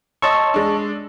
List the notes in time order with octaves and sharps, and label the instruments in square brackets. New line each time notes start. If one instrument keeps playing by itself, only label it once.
[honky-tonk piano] C#5 C6 E6 [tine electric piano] D#5 A5 C#6
[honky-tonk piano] G#3 D4